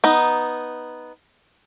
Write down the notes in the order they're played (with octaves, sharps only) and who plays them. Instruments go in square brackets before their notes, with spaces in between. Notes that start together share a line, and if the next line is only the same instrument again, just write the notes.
[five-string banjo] B3 D#4